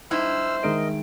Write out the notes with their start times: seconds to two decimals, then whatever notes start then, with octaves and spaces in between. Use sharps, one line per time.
0.11 G2 D#4 E4 C5 E6 F6
0.63 D#3 G#3 A#4 D#5 D7